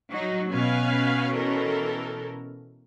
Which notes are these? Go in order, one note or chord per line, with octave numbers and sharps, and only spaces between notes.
F#3 D#4 F#4
B2 C#4 B4 F5 G#5
E3 A4 A#4